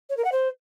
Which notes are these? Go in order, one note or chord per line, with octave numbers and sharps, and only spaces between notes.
C#5
A#4
F#5
C5